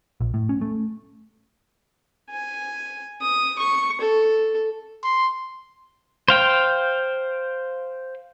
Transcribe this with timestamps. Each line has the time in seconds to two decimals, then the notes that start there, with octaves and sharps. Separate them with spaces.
0.21 A#1
0.34 A2
0.49 C#4
0.61 A3
2.30 G#5
3.22 D#6
3.59 C#6
4.01 A4
5.04 C6
6.28 C5 F5 G5